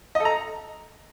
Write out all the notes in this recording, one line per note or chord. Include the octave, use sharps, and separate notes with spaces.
D#5
A4
A#5